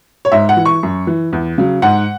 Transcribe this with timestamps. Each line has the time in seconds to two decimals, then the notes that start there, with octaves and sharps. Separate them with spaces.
0.25 C#5
0.32 G#2 E5
0.49 F#5
0.57 E3
0.65 C#6
0.83 F#2
1.07 E3
1.33 E2
1.58 C#3 F#3
1.82 G#2 F#5